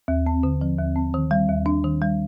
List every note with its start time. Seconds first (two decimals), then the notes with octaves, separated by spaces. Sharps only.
0.08 D#2
0.26 C4
0.43 D3
0.61 F3
0.79 D#2
0.96 C4
1.14 D#3
1.31 G3
1.49 D#2
1.66 D4
1.84 D#3
2.01 G3